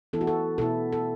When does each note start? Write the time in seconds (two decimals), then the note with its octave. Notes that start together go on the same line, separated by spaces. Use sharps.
0.13 E3 B3 E4 A4
0.21 F#4
0.27 A4
0.58 B2 B3 E4 A4
0.93 A4